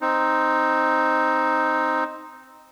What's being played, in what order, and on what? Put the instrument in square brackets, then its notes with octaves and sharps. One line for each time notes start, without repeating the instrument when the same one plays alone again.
[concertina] C4 D#4